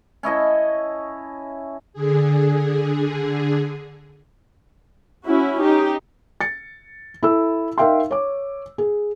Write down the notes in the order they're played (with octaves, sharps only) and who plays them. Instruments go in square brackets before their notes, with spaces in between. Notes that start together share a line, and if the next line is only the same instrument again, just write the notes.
[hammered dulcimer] C#4 E4 D#5 A5
[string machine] D3 G#4
[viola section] C#4 E4 F#4
D#4 G4
[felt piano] A6 C#7
E4 A4 E6
D#4 A#4 E5 F5 G5 C6
C#5 D6
G#4